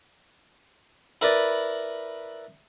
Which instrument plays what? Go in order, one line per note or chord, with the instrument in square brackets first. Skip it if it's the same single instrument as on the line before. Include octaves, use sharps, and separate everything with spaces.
[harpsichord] E4 A#4 B4 D5